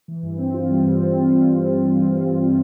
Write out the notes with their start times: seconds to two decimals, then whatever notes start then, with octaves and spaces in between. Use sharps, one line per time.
0.08 E3
0.23 G2
0.38 C4
0.54 F4
0.70 G3
0.85 G2
1.00 C4
1.16 F4
1.32 G3